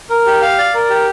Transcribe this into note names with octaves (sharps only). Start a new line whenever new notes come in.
A#4
G4
F5
D5
A#4
G4